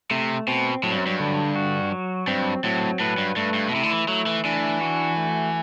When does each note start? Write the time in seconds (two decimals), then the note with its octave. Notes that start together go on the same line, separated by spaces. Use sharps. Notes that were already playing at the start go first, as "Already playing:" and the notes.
0.11 C3 A3
0.47 B2 C4
0.83 A2 F#3
0.91 G2
0.98 F#2
1.06 G2
1.20 D3
1.55 F#4
1.92 F#3
2.27 G2 C4
2.64 A2 F#3
3.00 A2 B4
3.18 G2
3.36 G2 A3
3.54 G2
3.69 B2
3.72 C3 E4
3.83 D3
3.90 E3
4.08 F#3 A3
4.26 E3
4.45 E3 D4
4.81 F#4
5.17 A3